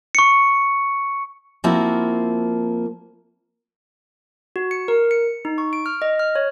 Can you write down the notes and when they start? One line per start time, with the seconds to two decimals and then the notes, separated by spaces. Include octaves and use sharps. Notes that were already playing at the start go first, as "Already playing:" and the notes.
0.15 C#6 C#7
1.64 F3 A#3 C4 E4 F#4
4.56 F#4
4.71 C#7
4.88 A#4
5.11 C#7
5.45 D#4
5.58 C#6
5.73 D7
5.86 F6
6.02 D#5
6.19 F6
6.35 C#5